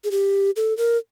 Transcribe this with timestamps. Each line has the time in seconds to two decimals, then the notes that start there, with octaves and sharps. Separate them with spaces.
0.04 G#4
0.11 G4
0.56 A4
0.77 A#4